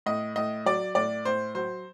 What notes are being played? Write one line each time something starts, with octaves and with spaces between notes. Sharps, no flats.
A2 D#5
A2 D#5
F#3 D5
A2 D5
A2 C5
F#3 C5